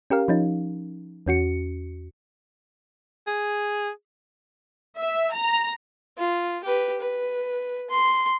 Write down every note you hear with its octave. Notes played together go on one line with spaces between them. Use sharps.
C#4 G4 A#4 F5
F3 C#4 D#4
E2 C#4 F#4 C#7
G#4
E5
A#5
F4
G4 B4
B4
C6